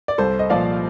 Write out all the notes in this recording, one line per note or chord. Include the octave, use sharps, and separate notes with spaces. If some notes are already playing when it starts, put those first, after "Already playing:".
D5
C2 A4 C5
D#5
A#2 F3 D5 F5